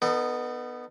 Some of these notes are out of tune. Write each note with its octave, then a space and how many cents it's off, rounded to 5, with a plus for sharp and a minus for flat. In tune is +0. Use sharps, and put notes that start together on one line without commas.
B3 +0 D#4 -30 A4 +35